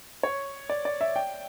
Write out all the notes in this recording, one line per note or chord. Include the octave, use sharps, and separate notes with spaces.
C#5
D5
D5
E5
G5